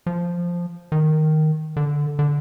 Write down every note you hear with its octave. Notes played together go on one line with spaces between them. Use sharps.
F3
D#3
D3
D3